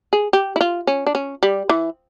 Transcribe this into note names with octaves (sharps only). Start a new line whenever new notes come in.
G#4
G4
E4
F4
C#4
D4
C#4
G3
E3